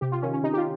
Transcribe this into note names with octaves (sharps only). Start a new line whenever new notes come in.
C3 G4
F4
D#3 C#4
C#4
C3 D#4
G4
F4